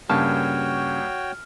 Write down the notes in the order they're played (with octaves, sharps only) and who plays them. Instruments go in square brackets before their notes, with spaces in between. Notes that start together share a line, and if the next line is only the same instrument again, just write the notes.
[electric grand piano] G2 A#3 [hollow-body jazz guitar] C#3 A5 [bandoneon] F#4 C#5 G5 [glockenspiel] F6